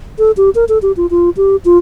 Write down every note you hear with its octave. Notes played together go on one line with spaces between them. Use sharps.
A4
G4
A#4
A4
G4
F4
F4
G4
F4